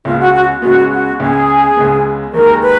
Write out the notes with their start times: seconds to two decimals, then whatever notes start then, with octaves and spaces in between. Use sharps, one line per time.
0.05 C#2 C#3 G#3 B3 F4
0.19 F#4
0.33 F#4
0.62 C#2 C#3 G#3 B3 F#4
0.92 F#4
1.19 C#2 C#3 G#3 B3 G#4
1.77 C#2 C#3 G#3 B3
2.34 D#2 D#3 G#3 A#4
2.62 B4